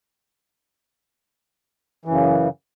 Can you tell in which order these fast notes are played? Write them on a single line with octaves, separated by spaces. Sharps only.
E3 F#2 C#3